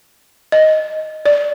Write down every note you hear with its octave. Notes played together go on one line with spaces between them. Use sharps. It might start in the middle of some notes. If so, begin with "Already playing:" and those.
D#5
D5